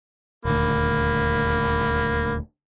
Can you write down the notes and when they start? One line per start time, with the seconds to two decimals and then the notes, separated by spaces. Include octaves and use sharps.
0.45 D#1 D2 A#3 B5